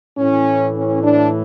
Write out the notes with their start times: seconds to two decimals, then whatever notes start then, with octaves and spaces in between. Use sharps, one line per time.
0.17 A2 E3 C#4
0.75 C#4
1.03 D4